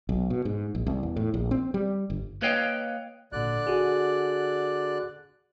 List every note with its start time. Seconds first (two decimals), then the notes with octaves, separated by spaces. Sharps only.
0.09 B1
0.30 B2
0.45 G#2
0.75 A#1
0.86 C2
1.03 E2
1.16 A2
1.34 A#1
1.51 C4
1.74 G3
2.10 G1
2.42 A#3 B4 C#5 D#5 F5 G5
3.32 G#1 A#2 D3 D5 F#6
3.67 F#4 G#4